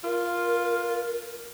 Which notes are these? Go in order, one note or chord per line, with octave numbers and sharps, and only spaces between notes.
F4 A#4